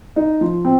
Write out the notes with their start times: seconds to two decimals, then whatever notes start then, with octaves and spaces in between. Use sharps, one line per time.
0.16 D#4
0.41 F3
0.65 C4